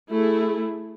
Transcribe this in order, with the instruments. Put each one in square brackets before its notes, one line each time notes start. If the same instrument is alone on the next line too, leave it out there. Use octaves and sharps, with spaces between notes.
[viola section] A3 E4 G#4